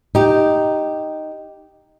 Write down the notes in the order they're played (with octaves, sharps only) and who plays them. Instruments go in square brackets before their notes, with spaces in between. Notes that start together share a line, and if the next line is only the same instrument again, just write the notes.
[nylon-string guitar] D#4 G4